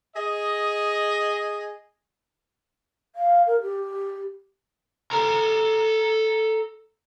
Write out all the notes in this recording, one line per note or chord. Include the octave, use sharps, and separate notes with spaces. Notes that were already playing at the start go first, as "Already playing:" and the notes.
G#4 D#5
F5
A#4
G4
A4 A#5